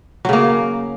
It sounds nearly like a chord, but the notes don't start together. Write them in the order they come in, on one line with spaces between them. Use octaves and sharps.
F#3 C#3 A#3